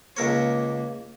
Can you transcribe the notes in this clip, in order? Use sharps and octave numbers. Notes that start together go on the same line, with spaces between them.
C#2 A#3 A#4 C#5